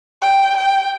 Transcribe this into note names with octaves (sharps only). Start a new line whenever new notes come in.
G5
G5